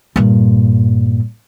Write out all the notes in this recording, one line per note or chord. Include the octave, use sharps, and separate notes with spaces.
G2 A#2